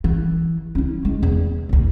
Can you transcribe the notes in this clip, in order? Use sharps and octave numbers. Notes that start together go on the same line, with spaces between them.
E3
C#4 E4
G#3
E2
A1 D2